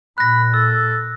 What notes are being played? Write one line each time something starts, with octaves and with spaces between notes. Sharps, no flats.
A#2 B5 F#6 A#6
A4 E6